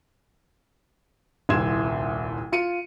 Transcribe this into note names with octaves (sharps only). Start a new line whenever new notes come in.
D#1 C2 E4 C6 G#6 E7
F4 C#7 D#7